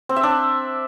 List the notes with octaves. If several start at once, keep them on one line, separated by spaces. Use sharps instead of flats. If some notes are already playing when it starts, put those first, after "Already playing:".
C4
E5
D4